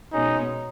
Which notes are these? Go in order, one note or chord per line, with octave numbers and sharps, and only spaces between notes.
B2 G#3 C#4 D#4